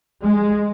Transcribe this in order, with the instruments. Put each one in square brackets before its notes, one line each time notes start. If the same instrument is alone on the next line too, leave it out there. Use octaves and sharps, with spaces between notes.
[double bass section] G#3